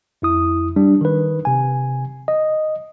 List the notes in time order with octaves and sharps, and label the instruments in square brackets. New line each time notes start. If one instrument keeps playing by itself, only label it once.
[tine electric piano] F2 E4 D#6
G3 D4
D#3 B4
C3 G#5
D#5